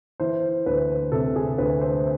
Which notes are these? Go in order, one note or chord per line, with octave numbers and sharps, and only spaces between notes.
E3 C5
D2 B4
C3 A4
G#4
D2 B4
C5